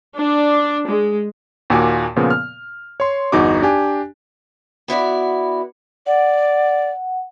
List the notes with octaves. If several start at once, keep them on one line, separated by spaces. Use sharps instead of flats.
D4
G#3
D#2 A#2 A#3 F#4 G#5 D6
A#2 C#3 F3 B3
F6
C#5 C6
G1 E2 D#4 F#4 D6
D4 G4 G#5
B3 E4 F#4 D5
D5 F#5